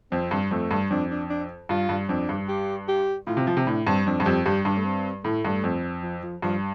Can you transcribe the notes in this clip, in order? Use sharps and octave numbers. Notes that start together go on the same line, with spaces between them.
F2 C4
G2
F2 A3
G2
F2 D4
D4
D4
G2 F4
G2
F2 D4
G2
G4
G4
A2 F4
C3
F3
C3
A2 D4
G2 C4
F2 D4
G2
F2 G4
G2 G4
G2 D4
A3
C4
A2 A3
G2
F2
F3
F3
G2 F3